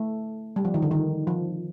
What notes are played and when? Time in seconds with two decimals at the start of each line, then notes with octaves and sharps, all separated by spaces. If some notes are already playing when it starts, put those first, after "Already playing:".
Already playing: A3
0.56 G3
0.65 F3
0.74 D#3
0.82 D3
0.91 D#3
1.27 F3